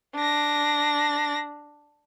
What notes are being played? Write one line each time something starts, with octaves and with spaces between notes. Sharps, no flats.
D4 A#6